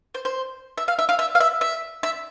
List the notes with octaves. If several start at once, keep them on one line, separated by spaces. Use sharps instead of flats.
C5
C5
E5
F5
E5
F5
E5
F5
E5
E5
E5